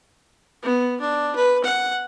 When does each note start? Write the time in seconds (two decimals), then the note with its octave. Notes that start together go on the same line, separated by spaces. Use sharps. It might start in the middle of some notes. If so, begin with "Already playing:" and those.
0.62 B3
1.00 D4
1.35 B4
1.64 F#5